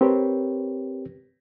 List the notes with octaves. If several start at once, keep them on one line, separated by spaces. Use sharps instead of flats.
C4 G4 A#4 B4 C#5